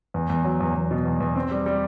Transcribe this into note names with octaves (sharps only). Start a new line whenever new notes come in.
E2
E2
F#3
E2
E2
B2
E2
E2
C4
G3
G3